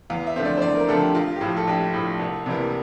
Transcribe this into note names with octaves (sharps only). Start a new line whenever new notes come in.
E2 F5
E5
D3 F3 A3 C4
D5
C5
E2 D5
A#4
D3 F3 A3 C4 A4
G4
A#1 F4
G4
A2 F3 F4
A4
A#1 G4
A2 F3
C2
C3 E3 G3 A#3